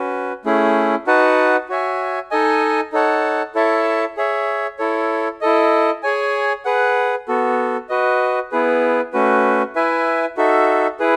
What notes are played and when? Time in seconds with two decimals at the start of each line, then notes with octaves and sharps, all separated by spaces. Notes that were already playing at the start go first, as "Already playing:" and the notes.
Already playing: C#4 F#4 B4
0.45 A3 C#4 E4 G#4
1.07 D#4 F#4 B4 F#5 A5
1.69 F#4 C#5 E5 G#5
2.31 D#4 A4 D#5 G#5
2.92 D#4 A4 C#5 F#5 A5
3.55 E4 A4 C#5 E5 A5
4.17 G#4 C#5 E5
4.79 E4 A4 C#5
5.41 E4 A4 D#5
6.03 G#4 C#5 G#5
6.65 G#4 B4 F#5
7.28 B3 F#4 A4
7.89 F#4 B4 D#5
8.52 B3 E4 G#4 B4
9.13 A3 C#4 F#4 B4
9.75 E4 B4 E5 G#5
10.37 D#4 F#4 A4 E5
10.99 E4 G#4 B4